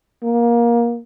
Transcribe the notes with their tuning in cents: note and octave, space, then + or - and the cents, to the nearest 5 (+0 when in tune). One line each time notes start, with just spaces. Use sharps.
A#3 +20